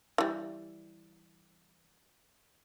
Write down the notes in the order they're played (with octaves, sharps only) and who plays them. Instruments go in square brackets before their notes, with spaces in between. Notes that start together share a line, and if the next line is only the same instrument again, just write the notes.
[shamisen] E3 G3